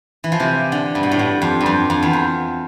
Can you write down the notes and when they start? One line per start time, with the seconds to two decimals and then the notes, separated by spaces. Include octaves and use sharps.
0.24 E3
0.32 F3
0.40 C3 E3
0.72 D3
0.95 G2
1.03 B2
1.11 A2
1.19 G2
1.42 F2
1.61 G2
1.66 F2
1.90 F2
2.02 E2
2.13 F2